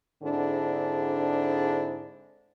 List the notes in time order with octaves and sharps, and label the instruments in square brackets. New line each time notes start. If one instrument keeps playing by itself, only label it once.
[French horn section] G#2 D3 C4 D4 E4 G#4